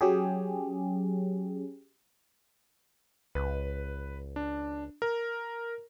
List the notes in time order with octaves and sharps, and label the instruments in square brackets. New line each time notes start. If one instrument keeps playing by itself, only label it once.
[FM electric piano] F#3 C#4 G4 G#4
[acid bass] C#2 [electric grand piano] B4
[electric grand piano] D4
A#4